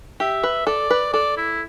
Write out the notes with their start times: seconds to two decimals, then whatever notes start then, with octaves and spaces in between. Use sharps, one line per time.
0.20 G4 E5
0.43 B4
0.67 A4 D5
0.90 B4
1.13 A4 D5
1.37 E4